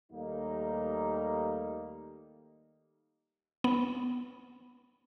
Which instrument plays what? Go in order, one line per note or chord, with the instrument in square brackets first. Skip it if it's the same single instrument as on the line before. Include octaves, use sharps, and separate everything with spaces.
[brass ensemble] D#2 G3 A3 A#3 D#4
[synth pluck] B3